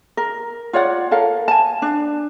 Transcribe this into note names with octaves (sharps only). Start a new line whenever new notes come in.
A#4
F4 C#5 D5 F#5
A4 A#4 F5
G#5 A5
D4